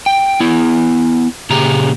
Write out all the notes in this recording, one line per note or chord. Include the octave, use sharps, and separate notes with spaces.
G5
B3 E4
A#2 C#3 G4 G#4 A#5